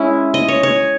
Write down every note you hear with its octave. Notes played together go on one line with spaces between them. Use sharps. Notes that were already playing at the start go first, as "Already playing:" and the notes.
Already playing: G#3 C#4 E4
D#5
C#5
C#5